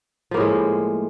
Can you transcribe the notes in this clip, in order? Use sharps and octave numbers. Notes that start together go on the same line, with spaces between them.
A2 F3 G#3 A#3